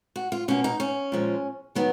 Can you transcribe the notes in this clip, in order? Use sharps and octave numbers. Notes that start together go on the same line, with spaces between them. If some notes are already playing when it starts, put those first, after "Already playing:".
F#4
F4
B2 A#3 C#4
D#4
C#4
A#2 F3 G#3
D#3 F#3 B3